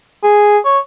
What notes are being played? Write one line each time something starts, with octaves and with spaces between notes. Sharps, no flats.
G#4
C#5